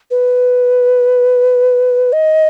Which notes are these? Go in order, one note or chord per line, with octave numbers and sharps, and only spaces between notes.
B4
D#5